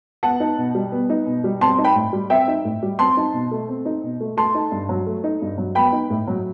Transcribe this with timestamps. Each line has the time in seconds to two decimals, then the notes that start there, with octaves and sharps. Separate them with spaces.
0.23 B3 F#5 A5
0.40 D#4
0.58 B2
0.75 G3
0.92 B3
1.10 D#4
1.26 B2
1.44 G3
1.61 C4 A5 C6
1.78 D#4
1.84 G5 B5
1.95 A2
2.13 G3
2.30 C4 E5 G5
2.48 D#4
2.65 A2
2.83 G3
2.99 C4 A5 C6
3.17 D#4
3.33 B2
3.51 A3
3.68 C4
3.85 D#4
4.03 B2
4.20 A3
4.37 A3 A5 C6
4.55 D#4
4.72 G2
4.89 F#3
5.06 A3
5.24 D#4
5.42 G2
5.58 F#3
5.75 B3 G5 B5
5.92 D#4
6.10 A2
6.27 F#3